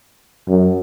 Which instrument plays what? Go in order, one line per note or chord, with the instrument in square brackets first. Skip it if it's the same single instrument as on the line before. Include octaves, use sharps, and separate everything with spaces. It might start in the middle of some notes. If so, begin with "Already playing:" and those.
[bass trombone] F#2